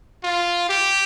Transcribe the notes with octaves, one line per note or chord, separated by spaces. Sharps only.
F4
G4